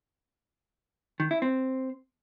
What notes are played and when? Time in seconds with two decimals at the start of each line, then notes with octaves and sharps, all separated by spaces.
1.20 D#3
1.31 E4
1.42 C4